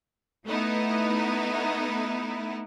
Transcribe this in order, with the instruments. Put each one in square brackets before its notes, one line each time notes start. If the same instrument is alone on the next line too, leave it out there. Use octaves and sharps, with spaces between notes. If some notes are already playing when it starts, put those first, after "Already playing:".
[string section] A3 B3 D#4 E4